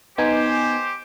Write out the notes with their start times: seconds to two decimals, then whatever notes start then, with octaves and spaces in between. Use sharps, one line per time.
0.18 B3 D#4 G4 C5 G#5